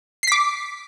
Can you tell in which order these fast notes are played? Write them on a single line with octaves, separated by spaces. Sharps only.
C7 B6 D6